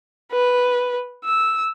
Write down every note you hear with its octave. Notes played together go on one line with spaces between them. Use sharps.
B4
E6